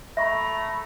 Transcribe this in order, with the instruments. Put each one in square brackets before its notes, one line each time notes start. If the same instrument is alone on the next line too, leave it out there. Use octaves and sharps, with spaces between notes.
[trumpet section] A3 A#5 B5 [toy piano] E5 C#6